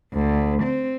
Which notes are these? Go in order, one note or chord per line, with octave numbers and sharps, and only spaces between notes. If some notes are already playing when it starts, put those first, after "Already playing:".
D2
C4